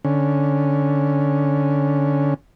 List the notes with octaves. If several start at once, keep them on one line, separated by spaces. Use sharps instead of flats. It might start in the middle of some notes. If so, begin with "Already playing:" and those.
D3 C#4